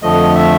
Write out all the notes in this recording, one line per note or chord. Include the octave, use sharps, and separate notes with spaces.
F2 D3 F3 A3 D#5
E5